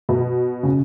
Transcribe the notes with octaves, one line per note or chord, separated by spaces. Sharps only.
B2
C#3